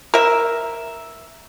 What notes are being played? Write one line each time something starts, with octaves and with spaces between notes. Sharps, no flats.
A#4 E5